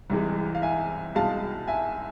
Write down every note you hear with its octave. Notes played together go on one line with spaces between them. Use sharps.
C2 C3 E3 G#3
F5
E5 G#5
C2 B2 G#3 F5 A5
E5 G#5